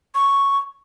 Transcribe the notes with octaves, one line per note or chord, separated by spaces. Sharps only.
C#6